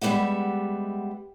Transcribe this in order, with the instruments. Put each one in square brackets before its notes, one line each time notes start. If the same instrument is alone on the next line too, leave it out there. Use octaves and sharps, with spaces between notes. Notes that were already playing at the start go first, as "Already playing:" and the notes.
[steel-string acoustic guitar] G3 G#3 B3 G4 E5 F#5